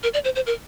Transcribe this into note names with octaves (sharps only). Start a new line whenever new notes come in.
A#4
D5
C5
C5
A#4